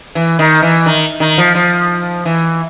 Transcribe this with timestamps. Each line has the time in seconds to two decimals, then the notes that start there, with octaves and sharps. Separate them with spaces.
0.15 E3
0.39 D#3
0.62 E3
0.86 D#3
1.20 D#3
1.38 F3
1.55 F3
2.25 E3